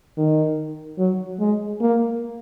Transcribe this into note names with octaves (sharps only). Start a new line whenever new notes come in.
D#3
F#3
G#3
A#3